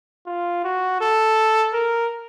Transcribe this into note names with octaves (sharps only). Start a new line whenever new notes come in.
F4
F#4
A4
A#4